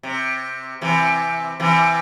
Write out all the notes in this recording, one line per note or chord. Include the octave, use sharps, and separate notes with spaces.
C3
C3 E3
C3 E3